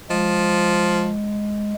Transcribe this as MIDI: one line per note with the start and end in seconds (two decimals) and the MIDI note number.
0.11 1.11 53
0.11 1.74 56